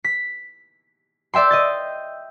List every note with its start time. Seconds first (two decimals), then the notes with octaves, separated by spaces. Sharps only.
0.04 B6
1.34 D5 E5 G5 C6
1.51 D#5 G6 A6